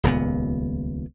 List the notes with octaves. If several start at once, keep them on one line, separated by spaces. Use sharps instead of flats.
D#1 C#2 A#2 B3